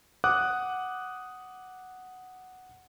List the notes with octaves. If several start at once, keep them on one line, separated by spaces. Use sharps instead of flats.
F#5 D6 D#6 F#6